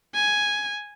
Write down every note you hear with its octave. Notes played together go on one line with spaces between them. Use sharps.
G#5